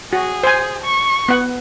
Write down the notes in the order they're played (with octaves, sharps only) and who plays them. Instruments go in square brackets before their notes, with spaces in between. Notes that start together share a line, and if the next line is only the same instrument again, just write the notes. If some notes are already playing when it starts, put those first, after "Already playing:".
[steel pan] F#4 [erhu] G#4
[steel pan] C5 G#5
[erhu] C#6
[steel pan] B3 F#5